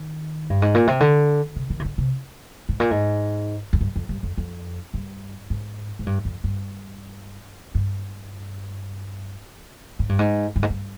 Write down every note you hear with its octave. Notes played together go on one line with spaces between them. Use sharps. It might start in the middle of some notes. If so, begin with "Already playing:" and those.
Already playing: D#3
G2
G#2
A#2
C3
D3
C3
D#3
C3
D3
C3
G#2
A#2
G#2
F2
G2
F2
G2
F2
F2
G2
G#2
G#2
G2
F2
G2
G2
G#2
G2
G#2
G2
G#2
G2